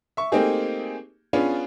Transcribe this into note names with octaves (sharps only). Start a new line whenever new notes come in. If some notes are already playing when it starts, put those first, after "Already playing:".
E5 C#6
A3 A#3 C4 D#4 G4 G#4
B3 C#4 D4 F4 G#4 B4